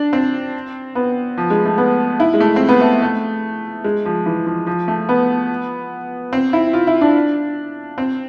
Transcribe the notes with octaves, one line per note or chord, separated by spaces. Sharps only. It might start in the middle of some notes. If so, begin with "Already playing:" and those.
Already playing: D4
C4
B3
F3
G#3
A3
B3
E4
G#3
A3
C4
B3
A3
A3
G#3
F3
E3
F3
F3
A3
B3
C4
E4
F4
E4
D4
C4